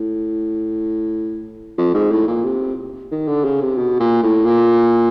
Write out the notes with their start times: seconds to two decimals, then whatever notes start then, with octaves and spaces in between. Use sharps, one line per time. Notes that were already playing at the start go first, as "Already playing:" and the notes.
Already playing: A2
1.78 F2
1.94 G#2
2.11 A2
2.27 A#2
2.44 C3
3.12 D#3
3.28 D3
3.45 C#3
3.62 C3
3.78 B2
4.00 A#2
4.23 A2
4.45 A#2